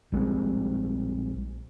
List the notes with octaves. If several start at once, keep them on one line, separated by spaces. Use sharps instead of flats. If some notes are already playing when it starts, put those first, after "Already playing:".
A#1 G3 G#3 C4